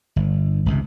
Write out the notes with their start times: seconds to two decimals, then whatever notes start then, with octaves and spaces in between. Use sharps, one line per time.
0.16 G1
0.66 G#1 C#2 C3